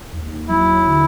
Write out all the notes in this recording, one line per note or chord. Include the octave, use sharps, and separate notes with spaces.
D#2
F#3 E4
D3